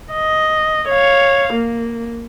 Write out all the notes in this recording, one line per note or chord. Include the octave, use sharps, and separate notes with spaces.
D#5
C#5 F5
A#3